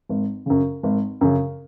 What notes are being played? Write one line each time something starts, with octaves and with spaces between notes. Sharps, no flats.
G#1
F#2 C#3
G#1
F#2 C#3